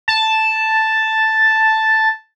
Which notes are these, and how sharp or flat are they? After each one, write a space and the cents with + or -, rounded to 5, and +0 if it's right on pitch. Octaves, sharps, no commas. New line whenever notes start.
A5 +0